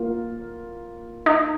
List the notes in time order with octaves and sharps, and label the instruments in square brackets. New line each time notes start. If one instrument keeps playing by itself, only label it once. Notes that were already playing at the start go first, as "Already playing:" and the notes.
Already playing: [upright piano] A#3 F4
[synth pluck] D#4